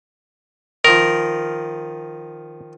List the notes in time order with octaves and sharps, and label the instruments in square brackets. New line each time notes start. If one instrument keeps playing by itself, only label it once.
[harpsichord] D#3 F3 [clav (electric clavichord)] A#4